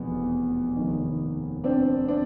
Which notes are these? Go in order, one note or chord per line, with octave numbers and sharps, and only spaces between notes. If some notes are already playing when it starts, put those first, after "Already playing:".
Already playing: F1 E2 B2 B3
F1 D#2 D#3
C4 D4
C4 D4